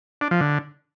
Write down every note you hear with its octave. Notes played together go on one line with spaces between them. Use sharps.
D4
F3
D3